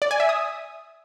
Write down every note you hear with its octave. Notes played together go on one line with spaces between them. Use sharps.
D5
G#5
E5
D#6